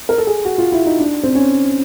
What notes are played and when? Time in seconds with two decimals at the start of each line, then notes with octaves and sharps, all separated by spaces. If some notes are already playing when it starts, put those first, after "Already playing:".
0.09 A#4
0.18 A4
0.27 G#4
0.45 F#4
0.58 F4
0.72 E4
0.86 D#4
0.99 D4
1.23 C4
1.35 C#4